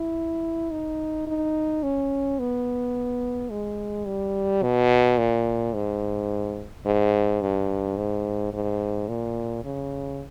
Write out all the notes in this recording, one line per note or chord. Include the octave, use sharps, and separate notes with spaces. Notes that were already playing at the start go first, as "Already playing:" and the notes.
Already playing: E4
D#4
D#4
C#4
B3
G#3
G3
B2
A#2
G#2
G#2
G2
G#2
G#2
A#2
C#3